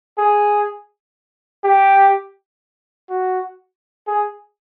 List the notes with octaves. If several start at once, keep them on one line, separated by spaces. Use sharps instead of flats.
G#4
G4
F#4
G#4